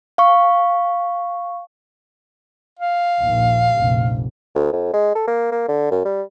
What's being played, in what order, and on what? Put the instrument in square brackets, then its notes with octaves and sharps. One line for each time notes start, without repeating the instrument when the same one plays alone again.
[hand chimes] F5 C#6
[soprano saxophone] F5
[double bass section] A#1 D#2
F1 A#1
[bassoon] D2
F2
G#3
A4
A#3
A#3
D3
F#2
G3